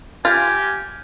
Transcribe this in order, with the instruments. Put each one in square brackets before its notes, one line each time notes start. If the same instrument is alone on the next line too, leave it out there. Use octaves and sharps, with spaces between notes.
[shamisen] F4 [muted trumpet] G4 [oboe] G#5 [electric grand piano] F6 A6